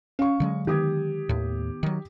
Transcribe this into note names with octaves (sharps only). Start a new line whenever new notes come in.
C#4 F5 C#6
D3 F#3 G#3
D#3 B3 G4 D#6 G#6
D#2 A2
D#3 F#3